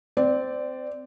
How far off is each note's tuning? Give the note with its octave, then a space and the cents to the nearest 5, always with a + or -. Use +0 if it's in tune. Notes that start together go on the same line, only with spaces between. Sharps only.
C4 -15 D5 +0